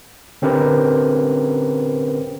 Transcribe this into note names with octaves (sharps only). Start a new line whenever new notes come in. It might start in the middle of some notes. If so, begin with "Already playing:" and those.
D3 C4 C#4 G4 A#4 B4